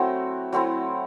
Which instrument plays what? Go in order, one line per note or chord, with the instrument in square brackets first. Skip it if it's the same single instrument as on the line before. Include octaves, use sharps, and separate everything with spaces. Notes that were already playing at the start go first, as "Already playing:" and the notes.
Already playing: [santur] F#3 A3 C4 E4 F#4
F#3 A3 C4 E4